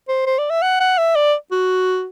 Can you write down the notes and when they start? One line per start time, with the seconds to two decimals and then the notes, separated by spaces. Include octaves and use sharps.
0.09 C5
0.26 C5
0.38 D5
0.50 E5
0.62 F#5
0.80 F#5
0.98 E5
1.15 D5
1.52 F#4